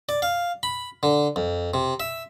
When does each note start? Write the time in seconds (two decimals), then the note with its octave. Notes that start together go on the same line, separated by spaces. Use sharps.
0.09 D5
0.22 F5
0.63 B5
1.03 D3
1.36 F2
1.74 C3
2.00 E5